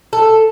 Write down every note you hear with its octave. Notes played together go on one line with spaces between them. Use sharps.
A4